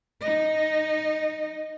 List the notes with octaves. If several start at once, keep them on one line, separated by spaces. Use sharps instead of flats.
D#4 D#5